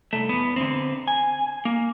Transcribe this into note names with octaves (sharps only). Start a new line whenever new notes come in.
C2 A3
E2 B3
D3 C4
G#5
A#3